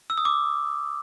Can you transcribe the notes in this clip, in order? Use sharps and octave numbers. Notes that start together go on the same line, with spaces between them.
E6
D#6
D6